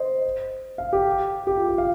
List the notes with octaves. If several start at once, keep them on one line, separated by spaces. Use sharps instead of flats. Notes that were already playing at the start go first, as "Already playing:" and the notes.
Already playing: C5 D#5
F5
G4
G4
F4
G4
F5